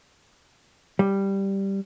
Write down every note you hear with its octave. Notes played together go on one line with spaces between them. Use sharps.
G3